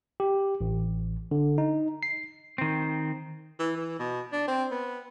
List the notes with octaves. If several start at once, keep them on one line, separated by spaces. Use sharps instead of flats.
G4
A1
D3
D#4
C7
D#3 C4
E3
E3
B2
D4
C4
B3